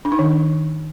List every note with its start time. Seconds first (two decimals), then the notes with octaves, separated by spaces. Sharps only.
0.05 D4
0.12 D#4
0.19 D#3